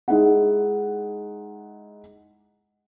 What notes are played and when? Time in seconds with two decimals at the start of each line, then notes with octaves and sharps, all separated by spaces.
0.08 G#3 D#4 E4 G#4 F#5